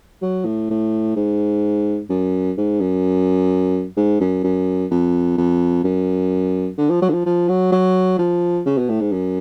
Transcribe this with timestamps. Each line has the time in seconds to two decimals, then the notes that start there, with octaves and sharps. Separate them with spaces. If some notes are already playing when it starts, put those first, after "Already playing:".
0.22 F#3
0.45 A2
0.70 A2
1.16 G#2
2.10 F#2
2.57 G#2
2.80 F#2
3.96 G#2
4.20 F#2
4.44 F#2
4.91 F2
5.37 F2
5.84 F#2
6.78 D3
6.90 F3
7.02 F#3
7.09 D3
7.13 F3
7.26 F3
7.49 F#3
7.72 F#3
8.18 F3
8.66 C#3
8.78 B2
8.89 A2
9.00 G#2
9.12 F#2